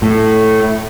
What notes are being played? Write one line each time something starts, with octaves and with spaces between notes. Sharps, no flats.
A2